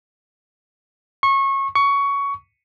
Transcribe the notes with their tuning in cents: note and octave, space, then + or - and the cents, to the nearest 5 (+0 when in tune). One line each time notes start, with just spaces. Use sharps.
C#6 -25
C#6 +15